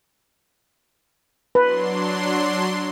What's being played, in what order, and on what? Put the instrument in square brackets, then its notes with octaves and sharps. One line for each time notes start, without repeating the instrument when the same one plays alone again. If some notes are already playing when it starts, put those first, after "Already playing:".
[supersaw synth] F#3 D4 C6 [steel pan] B4